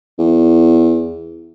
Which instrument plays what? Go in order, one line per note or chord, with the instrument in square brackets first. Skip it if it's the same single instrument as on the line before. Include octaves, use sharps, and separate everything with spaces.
[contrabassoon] E2